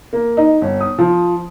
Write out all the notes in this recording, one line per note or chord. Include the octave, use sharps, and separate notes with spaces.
A#3
D#4
G1
D#6
F3